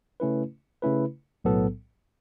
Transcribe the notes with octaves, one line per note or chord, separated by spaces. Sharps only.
C#3 A3 C#4 E4 B4
C#3 A3 C#4 E4 B4
B1 A2 F#3 B3 A4